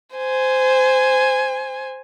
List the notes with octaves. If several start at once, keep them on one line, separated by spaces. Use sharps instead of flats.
C5 G#5